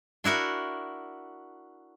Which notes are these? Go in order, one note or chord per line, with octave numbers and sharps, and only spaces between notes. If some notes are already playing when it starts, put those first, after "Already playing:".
D4 E4 F#4 A#4